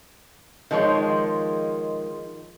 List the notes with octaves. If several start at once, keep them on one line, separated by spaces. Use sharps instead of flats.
D#3 F3 G#3 C#5